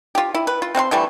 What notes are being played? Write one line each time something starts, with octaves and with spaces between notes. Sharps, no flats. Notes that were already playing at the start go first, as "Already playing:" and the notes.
F4 G4
E4
B4
F4
C4 C5 F5 C6
D3 E3 G3 A3